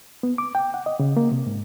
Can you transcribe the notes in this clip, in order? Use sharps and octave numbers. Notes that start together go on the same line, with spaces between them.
B3
D6
G5
F#5
D#5
C#3
A#3
C3
G#2